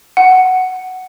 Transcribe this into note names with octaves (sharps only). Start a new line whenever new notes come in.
F#5